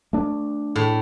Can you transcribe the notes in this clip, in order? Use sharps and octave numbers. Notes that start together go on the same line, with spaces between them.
A3 D4
A2